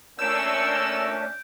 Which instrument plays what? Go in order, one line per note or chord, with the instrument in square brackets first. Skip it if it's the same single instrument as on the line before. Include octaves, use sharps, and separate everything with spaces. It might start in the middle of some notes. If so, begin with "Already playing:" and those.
[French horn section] A#2 [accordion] A3 C#4 D4 [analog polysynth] E6 [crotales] G6 D7